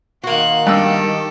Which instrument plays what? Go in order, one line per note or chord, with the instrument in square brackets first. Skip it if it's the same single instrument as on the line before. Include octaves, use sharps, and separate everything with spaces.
[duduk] D#3 [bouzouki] A#3 F#4 [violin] C6 F#6
[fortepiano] G2 E6 [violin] G4 A4